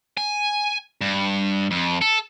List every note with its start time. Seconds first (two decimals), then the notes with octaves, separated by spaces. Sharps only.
0.17 G#5
1.01 G2
1.71 F2
2.01 A4